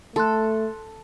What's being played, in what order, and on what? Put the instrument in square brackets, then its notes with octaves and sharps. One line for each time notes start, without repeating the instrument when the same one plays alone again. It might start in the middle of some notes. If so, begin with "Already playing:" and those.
[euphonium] A3 [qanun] A4 [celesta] A5 C6 F#6